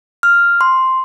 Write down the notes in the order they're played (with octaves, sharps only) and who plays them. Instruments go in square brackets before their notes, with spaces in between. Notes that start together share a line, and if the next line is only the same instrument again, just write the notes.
[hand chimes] F6
C6